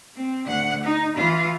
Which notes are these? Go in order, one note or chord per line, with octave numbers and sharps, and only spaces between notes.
C4
D2 F#5
D#4
E3 F4